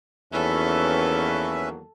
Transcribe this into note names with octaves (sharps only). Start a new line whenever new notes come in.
E2 D#3 F#3 A#3 C#4 A4 B4 E5